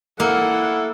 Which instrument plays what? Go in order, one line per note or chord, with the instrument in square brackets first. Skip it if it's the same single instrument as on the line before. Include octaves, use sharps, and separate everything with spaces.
[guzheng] A#3 [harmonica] E4 A4 [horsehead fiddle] F#5